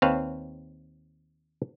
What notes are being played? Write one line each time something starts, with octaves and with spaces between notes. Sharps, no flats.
D#2 C4 B4 C#5 F5 A5